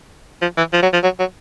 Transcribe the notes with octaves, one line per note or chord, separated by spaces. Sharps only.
F3
E3
F3
F#3
F3
F#3
F#3